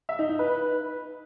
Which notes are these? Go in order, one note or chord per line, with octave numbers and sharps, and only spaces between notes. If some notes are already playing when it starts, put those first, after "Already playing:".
E5
D#4
D#4
B4